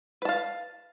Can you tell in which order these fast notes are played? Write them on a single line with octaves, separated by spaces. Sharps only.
B4 A5 F5